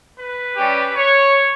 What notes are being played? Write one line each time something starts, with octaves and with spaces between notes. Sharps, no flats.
B4
G3 C#4 G4
C#5